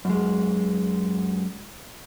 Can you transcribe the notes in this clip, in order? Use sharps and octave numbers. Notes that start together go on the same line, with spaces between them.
F#2 G#3